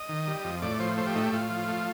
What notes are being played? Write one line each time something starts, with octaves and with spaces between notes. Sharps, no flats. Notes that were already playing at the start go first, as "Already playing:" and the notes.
Already playing: D#5
D#3
G3
F2
A2 D5
F3 C5
A3 C5
G4
A2 D#4
G4
A2 F4
F3
A3